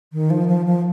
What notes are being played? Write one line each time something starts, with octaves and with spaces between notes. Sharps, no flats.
D#3
F3
F3
F3